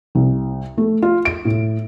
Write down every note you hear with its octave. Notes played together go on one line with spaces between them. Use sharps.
C2
A3
F4
D7
A2